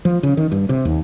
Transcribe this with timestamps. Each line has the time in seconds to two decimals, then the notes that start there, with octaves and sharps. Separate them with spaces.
0.05 F3
0.23 C#3
0.37 D#3
0.52 G2
0.69 C3
0.85 D#2